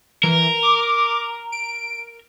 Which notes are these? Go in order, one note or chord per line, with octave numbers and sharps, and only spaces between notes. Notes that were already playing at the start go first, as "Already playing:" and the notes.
E3 A#4
D6
D7